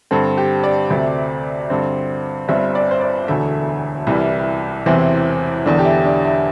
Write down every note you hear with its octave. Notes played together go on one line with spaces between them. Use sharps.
G2 D3 C4 A4
G4
D5
D2 C3 A3 C4
G2 D3 C4
G1 G2 G3 C4 E5
D5
C5
D5
E1 D2 D3 A3 E5
C2 C3 E3 G3 E4
E1 E2 C3 E3 C4
E1 E2 D3 D4
G4
E4
D4
E4